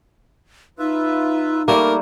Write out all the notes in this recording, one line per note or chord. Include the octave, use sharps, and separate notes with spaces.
D#4 F4 B4 E5
G3 A3 A#3 A#4